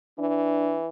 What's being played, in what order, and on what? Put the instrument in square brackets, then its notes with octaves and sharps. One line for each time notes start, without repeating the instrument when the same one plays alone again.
[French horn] E3 [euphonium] D4